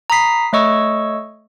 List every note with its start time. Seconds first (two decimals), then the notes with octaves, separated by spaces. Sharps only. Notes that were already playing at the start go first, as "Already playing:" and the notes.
0.10 A#5 B5 D#6 B6 C7
0.53 A3 C#5 D#5 C#6 E6